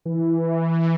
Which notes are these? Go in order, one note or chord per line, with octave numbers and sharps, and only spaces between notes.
E3